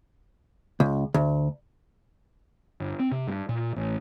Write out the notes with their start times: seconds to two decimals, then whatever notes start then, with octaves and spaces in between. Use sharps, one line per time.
0.80 C#2
1.14 D2
2.80 G1
2.99 C4
3.11 C3
3.27 G2
3.49 A#2
3.76 A1